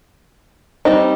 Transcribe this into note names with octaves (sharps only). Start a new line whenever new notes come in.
G3 C4 D#4